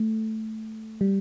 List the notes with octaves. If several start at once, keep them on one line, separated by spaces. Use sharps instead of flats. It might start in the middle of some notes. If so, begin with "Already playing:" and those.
Already playing: A3
G3